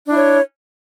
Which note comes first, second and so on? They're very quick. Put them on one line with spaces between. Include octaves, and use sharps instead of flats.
D4 E4 C#5